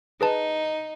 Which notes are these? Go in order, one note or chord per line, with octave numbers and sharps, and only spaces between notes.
D#4 G#4 B4 A5